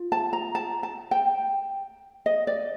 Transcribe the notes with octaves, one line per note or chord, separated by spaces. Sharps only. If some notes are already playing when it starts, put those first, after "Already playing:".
Already playing: F4
A5
A#5
A5
A5
G5
D#5
D5